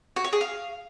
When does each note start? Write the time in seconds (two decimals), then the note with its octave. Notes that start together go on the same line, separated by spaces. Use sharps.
0.16 F#4
0.25 C#5
0.33 G#4
0.41 F5